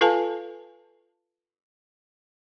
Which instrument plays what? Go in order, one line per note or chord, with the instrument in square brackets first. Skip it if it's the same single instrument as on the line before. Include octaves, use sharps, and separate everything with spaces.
[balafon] F4 A4 B4 F5 G#5 A5